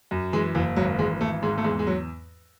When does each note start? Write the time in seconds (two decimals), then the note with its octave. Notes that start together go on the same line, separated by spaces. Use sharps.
0.11 F#2
0.33 E3 G#3
0.55 F#1 E3
0.76 G#1 F#3
0.99 E3 G#3
1.21 G#1 A3
1.43 G#2 G#3
1.58 A3
1.64 E2 G#3
1.79 G#3
1.87 F#3